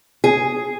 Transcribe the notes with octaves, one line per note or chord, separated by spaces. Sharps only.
G#4